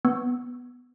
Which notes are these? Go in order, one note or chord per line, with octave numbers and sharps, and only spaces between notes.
B3